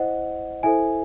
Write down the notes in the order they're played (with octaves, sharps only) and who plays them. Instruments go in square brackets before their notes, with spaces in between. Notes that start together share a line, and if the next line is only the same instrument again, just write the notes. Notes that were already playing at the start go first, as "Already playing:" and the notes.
Already playing: [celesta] E4 C5 D#5 F#5
E4 A4 C5 E5 G#5